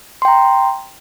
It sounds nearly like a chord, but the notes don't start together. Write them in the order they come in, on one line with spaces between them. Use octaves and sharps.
C6 G5 A#5